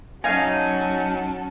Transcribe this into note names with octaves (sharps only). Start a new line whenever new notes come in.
F#3 C#4 D#4 F#4 F5 G#5 A5